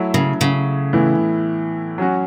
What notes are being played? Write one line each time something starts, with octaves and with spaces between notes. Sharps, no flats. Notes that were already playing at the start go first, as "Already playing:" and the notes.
Already playing: F#3 A3 E4
C#3
C#3
A2 E3 B3 E4
F#3 C#4 F#4